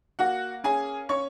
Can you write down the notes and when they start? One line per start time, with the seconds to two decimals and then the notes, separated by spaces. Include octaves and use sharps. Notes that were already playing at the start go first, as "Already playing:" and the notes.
0.19 A#3 F#4 F#5
0.64 C#4 G#4 G#5
1.09 C#4 C#5 C#6